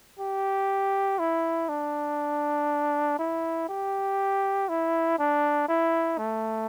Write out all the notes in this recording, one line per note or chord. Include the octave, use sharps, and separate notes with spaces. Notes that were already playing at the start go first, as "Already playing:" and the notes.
G4
E4
D4
E4
G4
E4
D4
E4
A3